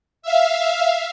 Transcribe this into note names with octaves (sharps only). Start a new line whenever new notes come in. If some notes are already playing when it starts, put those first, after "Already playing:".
E5 F5